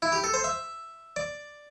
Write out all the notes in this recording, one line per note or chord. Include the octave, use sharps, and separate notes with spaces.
E4
G4
A4
C5
E5
D5